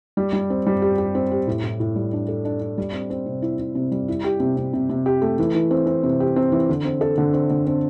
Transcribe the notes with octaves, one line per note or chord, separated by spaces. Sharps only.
G3
G3
C4
G3
G4
G4
C4
G4
A2
A2
A2
G3
D4
A4
D4
D4
G3
C4
C4
C3
E4
E4
C3
G3
E4
G4
C3
C3
C3
C3
G4
A3
E3
E3
C4
C4
C3
G4
C4
E3
D3
C4
A4
D3
C4
D3
C4